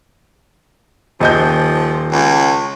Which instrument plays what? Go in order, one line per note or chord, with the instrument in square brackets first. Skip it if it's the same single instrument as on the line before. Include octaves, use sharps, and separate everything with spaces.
[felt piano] D#1 D#5 G6 [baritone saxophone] F3
[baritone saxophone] C#2